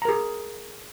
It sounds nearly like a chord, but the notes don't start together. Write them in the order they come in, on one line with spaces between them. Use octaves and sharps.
A#5 A#4 G#4